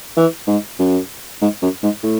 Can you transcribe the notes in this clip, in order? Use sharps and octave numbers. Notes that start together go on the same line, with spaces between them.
E3
G#2
F#2
G#2
F#2
G#2
A2